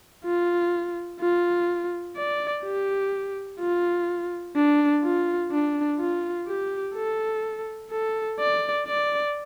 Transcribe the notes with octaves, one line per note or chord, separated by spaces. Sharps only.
F4
F4
D5
G4
F4
D4
F4
D4
F4
G4
A4
A4
D5
D5